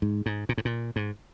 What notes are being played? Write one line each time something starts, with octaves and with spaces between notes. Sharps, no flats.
G#2
G#2
A#2
G#2
A#2
G#2